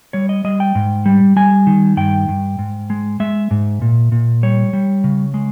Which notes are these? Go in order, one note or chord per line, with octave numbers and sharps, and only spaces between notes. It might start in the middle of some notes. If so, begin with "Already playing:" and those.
G3 C#5
D#5
G3 D#5
G5
G#2
G3
G3 G#5
D#3
G2 G5
G2
G#2
G#3
G#3 E5
G#2
A#2
A#2
G3 C#5
G3
C#3
G#3